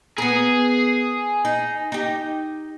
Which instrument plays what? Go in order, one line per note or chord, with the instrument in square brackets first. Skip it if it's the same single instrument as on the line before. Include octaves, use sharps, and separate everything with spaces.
[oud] B3 A#4 [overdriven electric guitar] G#4
[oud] D#4
D#4 G4